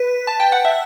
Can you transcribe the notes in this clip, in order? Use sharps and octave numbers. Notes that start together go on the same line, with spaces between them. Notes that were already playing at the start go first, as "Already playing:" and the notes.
Already playing: B4
A5
G5
F#5
E5